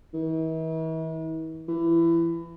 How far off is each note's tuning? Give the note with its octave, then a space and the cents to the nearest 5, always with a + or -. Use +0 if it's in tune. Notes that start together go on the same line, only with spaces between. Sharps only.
E3 -45
E3 +20